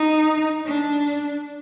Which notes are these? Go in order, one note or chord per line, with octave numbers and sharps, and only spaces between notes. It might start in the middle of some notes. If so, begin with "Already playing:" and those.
Already playing: D#4
D4